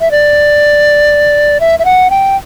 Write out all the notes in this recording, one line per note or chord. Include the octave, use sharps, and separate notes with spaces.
E5
D5
E5
E5
F#5
G5